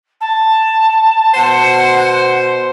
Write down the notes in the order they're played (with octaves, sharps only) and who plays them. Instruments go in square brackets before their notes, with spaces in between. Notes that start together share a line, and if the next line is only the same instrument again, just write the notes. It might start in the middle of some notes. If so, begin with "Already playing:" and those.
[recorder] A5
[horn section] B2 C5 [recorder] F#5